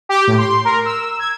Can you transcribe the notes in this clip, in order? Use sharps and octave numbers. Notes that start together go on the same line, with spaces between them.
G4
A2
C6
A#4
E6
G#6